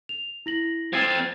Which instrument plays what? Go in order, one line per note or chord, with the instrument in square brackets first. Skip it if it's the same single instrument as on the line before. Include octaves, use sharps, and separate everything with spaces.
[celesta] F7
E4 A#6 F#7
[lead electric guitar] F3 C4 [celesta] G#6 A6 C7